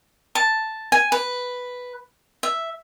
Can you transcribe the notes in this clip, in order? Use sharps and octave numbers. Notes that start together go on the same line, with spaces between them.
A5
G#5
B4
E5